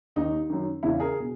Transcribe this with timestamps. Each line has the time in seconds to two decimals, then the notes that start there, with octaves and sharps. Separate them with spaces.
0.16 D#2 D#3 D#4
0.50 F#2 D#3
0.83 E2 C#3 E3 E4
1.00 G#4 A#4
1.20 B2